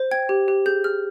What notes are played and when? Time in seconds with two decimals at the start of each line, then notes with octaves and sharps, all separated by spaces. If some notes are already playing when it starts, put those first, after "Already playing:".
Already playing: C5
0.11 G5 G#6
0.29 G4
0.48 G4
0.66 G#4 G6
0.84 G#4 F6